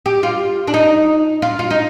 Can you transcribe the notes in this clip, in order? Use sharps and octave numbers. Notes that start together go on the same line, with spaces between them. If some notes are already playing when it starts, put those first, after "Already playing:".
G4
F4
D4
D#4
F4
F4
D#4